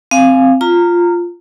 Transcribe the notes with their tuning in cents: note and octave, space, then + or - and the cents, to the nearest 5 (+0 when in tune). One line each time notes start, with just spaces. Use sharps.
C4 +0 F5 -5 G#5 +0
F4 +0 A#5 -20